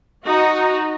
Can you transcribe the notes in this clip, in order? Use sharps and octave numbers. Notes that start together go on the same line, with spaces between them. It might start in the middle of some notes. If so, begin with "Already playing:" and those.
D#4 F#4